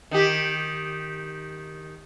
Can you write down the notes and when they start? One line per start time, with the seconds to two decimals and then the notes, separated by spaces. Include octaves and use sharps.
0.11 D#3 D#4 G4